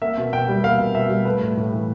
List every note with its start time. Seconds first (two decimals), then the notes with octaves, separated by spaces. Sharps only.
0.02 A#3 E5
0.17 B2
0.33 B2 G5
0.48 G3
0.63 A#3 F5
0.79 B2
0.94 B2 E5
1.10 G3
1.25 A3 B4
1.41 A2
1.57 A2
1.72 E3